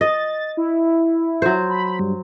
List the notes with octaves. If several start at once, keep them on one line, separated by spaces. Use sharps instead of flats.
D#5 A6
E4
F#3 C5
B5
G2